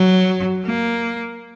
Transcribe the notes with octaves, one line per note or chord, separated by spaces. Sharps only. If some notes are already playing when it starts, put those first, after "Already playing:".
Already playing: F#3
A#3